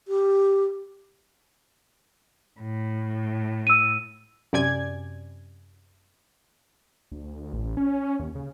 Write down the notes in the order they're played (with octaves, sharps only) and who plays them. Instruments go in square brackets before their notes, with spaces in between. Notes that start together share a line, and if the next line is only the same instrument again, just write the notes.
[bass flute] G4
[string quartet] A2
[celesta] E6 D#7
[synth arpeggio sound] F#2 C3 D5 G#5 G#6
[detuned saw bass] D2
A1
C#4
D#2
C#3